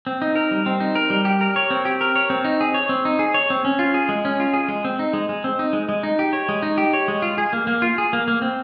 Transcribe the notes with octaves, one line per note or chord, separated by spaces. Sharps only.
C4
D#4
A#4
G3
C4
D#4
A#4
G3
G4
A#4
C#5
C4
G4
A#4
C#5
C4
D#4
G#4
C#5
C4
D#4
G#4
C#5
C4
C#4
F4
G#4
G#3
C#4
F4
G#4
G#3
C4
D#4
G#3
G#3
C4
D#4
G#3
G#3
D#4
G4
C#5
G#3
D#4
G4
C#5
G#3
F4
G#4
A#3
A#3
F4
G#4
A#3
A#3
C4